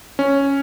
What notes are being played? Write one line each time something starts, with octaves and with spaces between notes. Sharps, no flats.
C#4